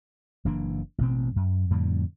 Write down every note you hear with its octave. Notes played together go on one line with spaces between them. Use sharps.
F#1 E3 A#3 D4
A1 B2 C4
F#2
F2 A2 D3 G3